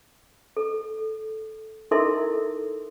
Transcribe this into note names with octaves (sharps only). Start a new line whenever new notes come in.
A4
D#4 E4 A4 A#4 E5 C6